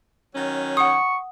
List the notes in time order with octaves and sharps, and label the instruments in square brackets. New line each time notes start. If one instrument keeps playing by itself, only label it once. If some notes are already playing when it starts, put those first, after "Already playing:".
[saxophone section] D#3 F#3 C#4
[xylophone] F#5 D#6 [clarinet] C#6